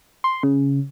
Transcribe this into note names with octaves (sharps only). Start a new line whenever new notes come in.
C6
C#3